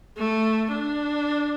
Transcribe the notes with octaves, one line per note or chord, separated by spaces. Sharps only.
A3
D4